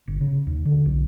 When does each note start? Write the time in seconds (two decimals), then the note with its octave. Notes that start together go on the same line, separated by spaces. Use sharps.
0.08 G1
0.21 C#3
0.47 D#2
0.65 D3
0.86 B1